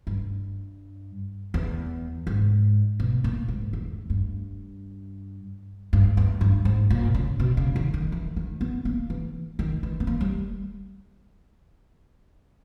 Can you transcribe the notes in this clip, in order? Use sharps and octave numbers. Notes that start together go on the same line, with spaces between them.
G2
E2
G#2
B2
A#2
G#2
E2
G2
G2
E2
G2
G#2
A#2
C#3
B2
C#3
D#3
D#3
E3
D#3
B3
A#3
E3
D#3
E3
B3
A#3
G3